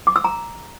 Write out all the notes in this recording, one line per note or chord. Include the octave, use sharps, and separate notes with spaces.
D6
E6
A#5